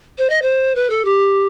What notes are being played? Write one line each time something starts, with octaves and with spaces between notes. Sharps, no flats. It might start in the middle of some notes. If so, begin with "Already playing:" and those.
C5
D#5
C5
B4
A4
G4